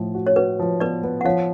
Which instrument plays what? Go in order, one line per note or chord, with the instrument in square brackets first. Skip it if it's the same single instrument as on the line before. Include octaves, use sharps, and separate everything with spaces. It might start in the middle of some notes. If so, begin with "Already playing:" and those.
Already playing: [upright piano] A2 F3
F#4
[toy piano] C#5
[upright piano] F#4 [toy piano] B4
[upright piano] F3
[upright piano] B3 [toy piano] B4 D5
[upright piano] B3
[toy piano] F#5
[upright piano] F3 [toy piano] C#5 F5